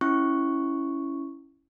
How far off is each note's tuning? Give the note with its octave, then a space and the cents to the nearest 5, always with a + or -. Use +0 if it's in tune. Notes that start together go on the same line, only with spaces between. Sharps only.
C#4 +0 E4 +0 C#6 +0